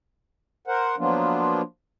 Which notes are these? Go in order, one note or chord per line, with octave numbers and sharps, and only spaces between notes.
A#4 C5 F#5
F3 F#3 A#3 B3 D4 F4